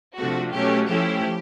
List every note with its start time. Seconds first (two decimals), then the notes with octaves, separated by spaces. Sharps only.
0.19 C3 F3 A3 D4 F#4
0.54 B2 F#3 A3 C#4 G4
0.89 F3 A3 C#4 E4 G4